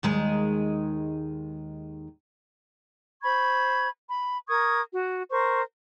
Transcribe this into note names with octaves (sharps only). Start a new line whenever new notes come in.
D#2 D#3 G#3
C5 B5 C#6 G#6
B5
A#4 C#6 D#6 G#6
F#4
A#4 C5 C#6